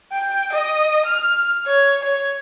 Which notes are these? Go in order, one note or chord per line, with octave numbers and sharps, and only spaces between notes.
G5
D#5
F6
C#5
C#5